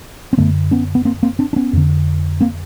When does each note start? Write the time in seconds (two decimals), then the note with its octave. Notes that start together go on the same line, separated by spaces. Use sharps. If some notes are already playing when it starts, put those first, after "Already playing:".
0.33 C4
0.37 F#2 D3 A3 B3
0.71 B3 C#4
0.95 B3
1.05 A#3 C4
1.23 A#3 C4
1.39 C4 D4
1.53 D4
1.56 B3 C#4
1.73 F2 D3
2.41 A#3 C4